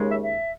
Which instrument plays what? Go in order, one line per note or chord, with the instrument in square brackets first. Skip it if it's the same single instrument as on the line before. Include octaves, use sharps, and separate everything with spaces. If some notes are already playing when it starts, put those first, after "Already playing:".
Already playing: [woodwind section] D#2 C#3 G#3
E5
E5